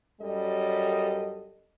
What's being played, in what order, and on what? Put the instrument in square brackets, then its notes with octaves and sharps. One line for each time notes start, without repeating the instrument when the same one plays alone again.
[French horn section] F#2 G3 A4 D#5